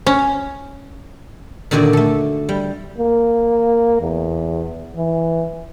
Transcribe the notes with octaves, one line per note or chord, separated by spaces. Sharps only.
C#4
A#2 D3 D#3 F#4 D5 E5
A3 A4
G3
A#3
E2
E3